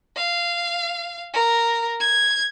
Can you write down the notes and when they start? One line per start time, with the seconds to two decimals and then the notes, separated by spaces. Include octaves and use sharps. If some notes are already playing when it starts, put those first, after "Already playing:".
0.17 F5
1.33 A#4
2.00 G#6